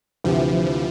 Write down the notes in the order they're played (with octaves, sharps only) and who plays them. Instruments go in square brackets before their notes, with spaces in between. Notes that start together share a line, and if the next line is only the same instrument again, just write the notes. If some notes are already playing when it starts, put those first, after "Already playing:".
[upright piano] D2 C3 E3 [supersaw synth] F3